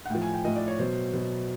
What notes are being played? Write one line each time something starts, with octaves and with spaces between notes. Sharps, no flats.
F#5
A2 F3 G5
G#5
G5
A2 F3 D#5
D5
C#5
B2 F#3 C5
B2 F#3